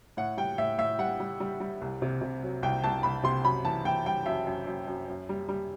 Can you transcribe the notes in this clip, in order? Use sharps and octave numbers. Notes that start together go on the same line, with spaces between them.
A2 F#5
G3 G5
A2 E5
A2 E5
G3 F#5
G3
G3
G3
C2
C3
C3
F#3
C2 G5
C2 A5
C2 B5
C3 C6
F#2 B5
E3 A5
E3 G5
G3 G5
F#2 E5
F#2
F#2
F#2
F#2
G3
G3